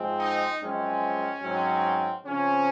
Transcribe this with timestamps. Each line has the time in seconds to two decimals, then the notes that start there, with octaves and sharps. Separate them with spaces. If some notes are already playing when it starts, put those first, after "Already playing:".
Already playing: G#2 F3 G#3 C4
0.19 D#4
0.60 F#2 F3 G#3 C4 C#4
1.43 G#2 F#3 C4
2.25 C#3 F3 C4 C#4